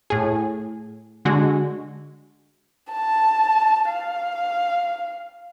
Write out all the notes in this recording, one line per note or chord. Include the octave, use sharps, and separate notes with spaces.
A2 G#4
D3 G#3 F#4
A5
F5